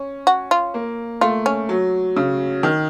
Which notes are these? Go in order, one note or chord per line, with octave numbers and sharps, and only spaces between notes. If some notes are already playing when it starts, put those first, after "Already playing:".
Already playing: C#4
F#4
F4
A#3
A3 F4
C#4
F#3
C#3
D#3